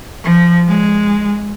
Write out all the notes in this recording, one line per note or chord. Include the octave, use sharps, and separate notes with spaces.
F3
G#3